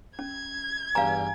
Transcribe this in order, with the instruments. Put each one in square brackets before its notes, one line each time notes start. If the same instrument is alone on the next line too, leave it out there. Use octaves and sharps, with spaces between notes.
[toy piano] C#4 [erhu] G#6
[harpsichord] E2 G2 [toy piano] F5 A#5 [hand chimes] G#5